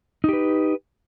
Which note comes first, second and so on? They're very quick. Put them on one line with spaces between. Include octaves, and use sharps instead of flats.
D#4 G4 B4